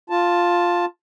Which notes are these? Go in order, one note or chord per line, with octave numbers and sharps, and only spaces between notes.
F4 A5